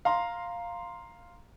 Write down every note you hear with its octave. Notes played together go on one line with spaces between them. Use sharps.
F5 A#5 C6